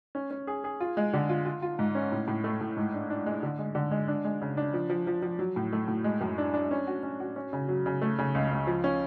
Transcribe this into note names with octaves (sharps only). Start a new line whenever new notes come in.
C#4
C#4
G#4
G#4
F4
G#3
D3
F4
F4
F4
G#2
C#4
A2
A2
A3
A2
G#2
D4
D4
G#3
D3
G#3
D3
G#3
D4
G#3
C#3
D4
F3
F3
F3
F3
F#3
A2
A3
A2
G#3
F#2
D4
D4
C#4
F#4
C#4
F#4
C#4
C#3
F#3
C#3
A3
C#3
C#2
C#2
F3
C#4